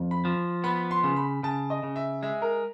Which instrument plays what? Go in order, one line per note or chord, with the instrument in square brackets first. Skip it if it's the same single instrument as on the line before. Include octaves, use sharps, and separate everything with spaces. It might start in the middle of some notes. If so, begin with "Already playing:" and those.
Already playing: [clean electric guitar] F2
[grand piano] B5
[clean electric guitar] F3
[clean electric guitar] B3 [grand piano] B5
[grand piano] C6
[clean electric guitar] C#3
[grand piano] B5
[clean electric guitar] C#3 [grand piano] A5
[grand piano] D#5
[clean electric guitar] C#3
[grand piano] E5
[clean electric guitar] G#3 [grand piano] E5
[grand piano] A#4